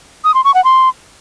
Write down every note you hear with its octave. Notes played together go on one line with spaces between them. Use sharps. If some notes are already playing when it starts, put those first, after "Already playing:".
D#6
C6
C#6
F#5
C6